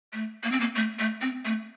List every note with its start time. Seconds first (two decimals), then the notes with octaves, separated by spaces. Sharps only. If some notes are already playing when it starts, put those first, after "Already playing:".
0.13 A3
0.43 A#3
0.52 C4
0.60 A#3
0.76 A3
0.99 A3
1.21 C4
1.45 A3